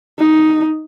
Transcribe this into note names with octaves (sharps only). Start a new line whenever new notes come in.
D#4